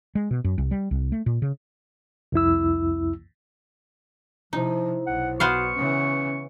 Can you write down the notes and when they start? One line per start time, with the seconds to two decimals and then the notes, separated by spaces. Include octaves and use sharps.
0.15 G#3
0.31 B2
0.44 F#2
0.58 C2
0.71 G3
0.91 C2
1.12 A3
1.26 A#2
1.42 C#3
2.32 C2 F2 E4 E6
4.53 C3 F3 D#4 E4 C5
5.07 B1 F#5
5.40 B3 F#4 C5 F5 C#6
5.75 C#3 E3 C#4